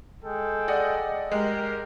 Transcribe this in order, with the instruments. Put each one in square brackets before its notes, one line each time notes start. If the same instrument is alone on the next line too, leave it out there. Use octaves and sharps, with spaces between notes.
[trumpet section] G#3 A4 G5
[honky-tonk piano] D5 D#5 F#5
[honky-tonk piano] G#3 [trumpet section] G4 A#4